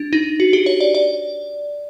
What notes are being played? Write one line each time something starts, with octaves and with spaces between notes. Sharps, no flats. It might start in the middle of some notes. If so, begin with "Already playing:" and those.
Already playing: D4
D#4
F#4
G4
C#5
D5
D5